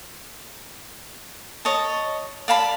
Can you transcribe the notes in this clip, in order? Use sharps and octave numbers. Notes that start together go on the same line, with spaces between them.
C#5 D#5 A5
D5 F5 A5 B5